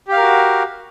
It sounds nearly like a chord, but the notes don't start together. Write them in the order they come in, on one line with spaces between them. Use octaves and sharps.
G4 F5 A#4 F#4